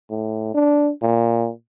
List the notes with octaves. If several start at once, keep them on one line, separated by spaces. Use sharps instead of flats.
A2
D4
A#2